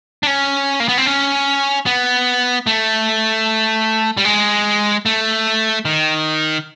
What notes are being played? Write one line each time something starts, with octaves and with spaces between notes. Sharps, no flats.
D4
C#4
A#3
B3
C4
C#4
B3
A3
G3
G#3
A3
D#3